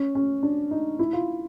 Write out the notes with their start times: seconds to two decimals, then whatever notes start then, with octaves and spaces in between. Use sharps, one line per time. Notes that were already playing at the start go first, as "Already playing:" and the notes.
Already playing: C#4
0.15 C#4
0.43 D4
0.71 D#4
0.99 E4
1.13 F4